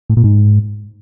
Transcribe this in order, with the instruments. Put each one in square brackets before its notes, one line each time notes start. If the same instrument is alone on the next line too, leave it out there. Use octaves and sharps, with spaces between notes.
[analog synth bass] A2
A#2
G#2